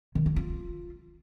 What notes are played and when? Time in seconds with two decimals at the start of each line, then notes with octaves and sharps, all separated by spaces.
0.15 D#3
0.26 D4
0.36 F4